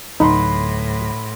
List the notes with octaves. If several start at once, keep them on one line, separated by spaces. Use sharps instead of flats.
D2 A2 F#3 D#4 B4 F#5 C6